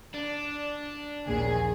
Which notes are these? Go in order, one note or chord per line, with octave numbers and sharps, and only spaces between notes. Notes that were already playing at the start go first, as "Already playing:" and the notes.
D4
A#1 D#2 G#4